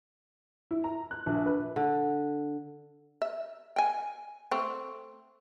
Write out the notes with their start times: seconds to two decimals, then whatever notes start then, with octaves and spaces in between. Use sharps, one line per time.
0.71 E4
0.84 A#5
1.11 F#6
1.26 A#1
1.46 B4
1.76 D3
3.22 E5
3.76 G5 G#5
4.51 A3 C4